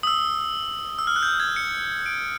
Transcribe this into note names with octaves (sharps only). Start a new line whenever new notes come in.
D#6
E6
E6
F6
F#6
G6
G#6
C#7
D7